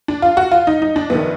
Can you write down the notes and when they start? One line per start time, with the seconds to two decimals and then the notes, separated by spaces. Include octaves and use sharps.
0.08 D4
0.22 F4
0.37 F#4
0.51 F4
0.67 D#4
0.82 D#4
0.96 D4
1.10 A#1 B3
1.15 D#3